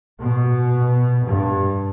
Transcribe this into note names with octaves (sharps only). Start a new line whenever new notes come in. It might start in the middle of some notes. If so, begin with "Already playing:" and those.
B2
G2